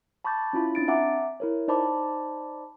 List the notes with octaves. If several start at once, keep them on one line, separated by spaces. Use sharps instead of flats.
A5 B5 C#6 D6 G6 A6
C#4 E4 F4 B5
C4 D4 A6 D7
E5 F#5 G#5 A#5 D6
E4 A#4 C#5
D#4 C5 D5 A5 B5 D6